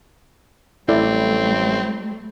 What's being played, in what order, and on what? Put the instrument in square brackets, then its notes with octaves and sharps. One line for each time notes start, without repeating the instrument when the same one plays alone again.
[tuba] A1 [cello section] F#3 G3 A3 [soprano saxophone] C4 [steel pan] E4 A4 D5